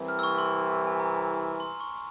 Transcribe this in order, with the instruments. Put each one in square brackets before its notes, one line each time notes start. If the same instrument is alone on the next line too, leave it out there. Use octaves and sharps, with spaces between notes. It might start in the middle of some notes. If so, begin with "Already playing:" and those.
Already playing: [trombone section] C2 C3 E3
[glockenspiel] F6
E6
C#6
C6
G#5
A#5
C6
C#6